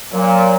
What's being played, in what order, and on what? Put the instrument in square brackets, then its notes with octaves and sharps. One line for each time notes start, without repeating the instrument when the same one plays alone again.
[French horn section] A#2 [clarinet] F#3